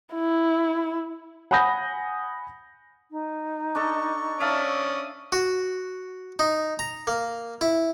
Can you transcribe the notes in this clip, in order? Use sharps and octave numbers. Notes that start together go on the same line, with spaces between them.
E4
F#5 G#5 B5 D#6 G6 A#6
D#4
D4 A4 D#5 C#6
C#4 D5 E5 F5 A5 D#6
F#4
D#4
A#5
A#3
E4